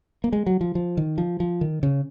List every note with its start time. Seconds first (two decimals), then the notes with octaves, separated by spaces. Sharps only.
0.24 A#3
0.33 G#3
0.47 F#3
0.61 F3
0.75 F3
0.97 D#3
1.18 F3
1.40 F3
1.61 D#3
1.83 C#3